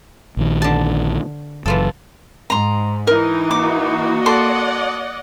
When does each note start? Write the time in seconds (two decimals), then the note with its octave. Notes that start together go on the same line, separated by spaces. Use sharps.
0.37 A#1 D#3
0.62 D3 A5
1.66 F#1 F#2 E3 F4 A4
2.50 G#2 A#5 C6
3.07 E3 D#4 A#4
3.51 A#3 F#4 D6
4.26 A4 D5 D#5 F#5 C6